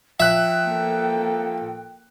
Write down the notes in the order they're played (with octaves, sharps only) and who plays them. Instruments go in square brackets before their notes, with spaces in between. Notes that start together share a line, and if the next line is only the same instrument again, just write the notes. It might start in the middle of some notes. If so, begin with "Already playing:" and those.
[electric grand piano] F3 F#6 [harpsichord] E5 [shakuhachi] G5
[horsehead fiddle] A#3 A4